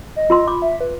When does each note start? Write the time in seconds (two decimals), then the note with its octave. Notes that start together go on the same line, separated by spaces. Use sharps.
0.16 D#5
0.30 F4 A#4 C6
0.47 B5 D6
0.62 E5
0.81 B4